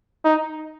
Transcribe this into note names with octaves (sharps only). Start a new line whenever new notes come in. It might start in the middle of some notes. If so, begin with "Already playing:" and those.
D#4